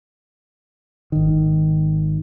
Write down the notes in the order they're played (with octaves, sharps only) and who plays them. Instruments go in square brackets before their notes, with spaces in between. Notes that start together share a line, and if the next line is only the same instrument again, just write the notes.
[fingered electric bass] G#1 D#3